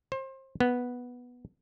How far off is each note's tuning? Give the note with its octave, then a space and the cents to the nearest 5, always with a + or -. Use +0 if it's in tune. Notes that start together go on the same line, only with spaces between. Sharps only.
C5 +30
B3 -5